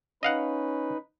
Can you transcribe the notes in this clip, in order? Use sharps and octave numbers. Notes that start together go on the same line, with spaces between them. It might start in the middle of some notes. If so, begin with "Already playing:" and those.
C#4 D#4 B4 D#5 F5 F#5